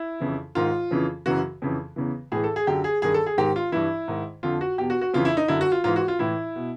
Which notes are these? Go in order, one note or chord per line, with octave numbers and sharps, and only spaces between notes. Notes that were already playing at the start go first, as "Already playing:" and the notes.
Already playing: E4
F2 C#3 E3
G#2 D#3 F4
F2 C#3 E3
F#2 C#3 E3 F#4
F2 C#3 E3
E2 C#3 E3
A2 E3 G#4
A4
G#4
F#2 D3 G4
G#4
G2 D#3 G#4
A4
G#4
G#2 D#3 G4
F4
G2 E3 E4
G#2 D#3
F2 D3 F4
F#4
E2 B2 G4
F#4
F#4
F2 C#3 E3 F4
E4
D#4
F#2 D3 E4
F#4
F4
G#2 E3 F4
F#4
F4
A2 E3 E4
B2